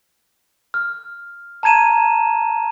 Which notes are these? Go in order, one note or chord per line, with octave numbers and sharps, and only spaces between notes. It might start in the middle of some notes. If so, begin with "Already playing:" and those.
F6
A5 A#5 G#6 D#7 E7